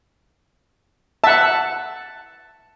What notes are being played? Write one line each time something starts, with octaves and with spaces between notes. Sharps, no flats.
E5 F#5 A5